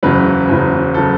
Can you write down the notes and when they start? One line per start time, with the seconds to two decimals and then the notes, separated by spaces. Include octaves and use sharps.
0.03 F#1 E2 C#3 F#3 B4
0.48 F#1 E2 C#3 F#3
0.94 C#3 F#3 A4